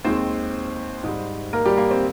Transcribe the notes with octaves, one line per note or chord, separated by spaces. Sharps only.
D#2 D#3 G#3 C4 C5
G#2 G3
A#3 A#4
G3 G4
A#3
C4